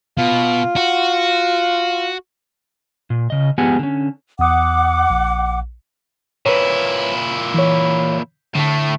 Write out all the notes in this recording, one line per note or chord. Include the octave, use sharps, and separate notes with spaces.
B2 F4
F#4
A#2
C#3 D#5
F3 G#3 B3 G4 F#5 G#5
D3 C#4
E2 F#5 D6 D#6
A#1
A#2 E4 B4 C#5
E3 C#5
A2 D3 A3